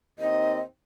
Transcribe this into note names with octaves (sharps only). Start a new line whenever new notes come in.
D#2 C4 D#4 D#5